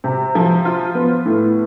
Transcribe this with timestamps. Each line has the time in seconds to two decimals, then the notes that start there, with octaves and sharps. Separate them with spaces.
0.04 C3
0.35 F3
0.65 F4
0.95 B3
1.25 A2